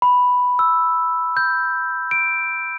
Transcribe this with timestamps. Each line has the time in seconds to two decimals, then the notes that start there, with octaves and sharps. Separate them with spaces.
0.02 B5
0.59 E6
1.37 G6
2.11 D7